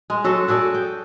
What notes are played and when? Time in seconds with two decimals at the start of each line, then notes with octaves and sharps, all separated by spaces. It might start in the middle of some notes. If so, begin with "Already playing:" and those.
0.10 G#3
0.24 F#3 F#4 A4
0.48 F#4 G#4 A4 D5
0.74 G5